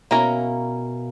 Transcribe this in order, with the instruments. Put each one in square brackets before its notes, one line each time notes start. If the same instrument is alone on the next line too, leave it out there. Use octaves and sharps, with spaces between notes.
[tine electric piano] B2 [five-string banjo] A#3 C#4 E4 A#4 C#5